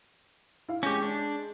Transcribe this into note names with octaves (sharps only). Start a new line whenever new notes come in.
E4 F5
G#3 C#4 G4 G6 A#6
D4